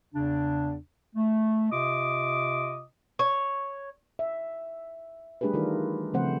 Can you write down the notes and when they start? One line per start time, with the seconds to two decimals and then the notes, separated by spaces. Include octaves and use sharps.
0.14 E2 C#3 D4
1.16 A3
1.71 C3 F4 D#5 D6 D#6
3.19 C#5
4.19 E5
5.41 G3 A3 D4 G4 G#4 B4
5.54 D#3 E3 F4 A#4
6.14 C#3 F3 A3 C4 C5 F#5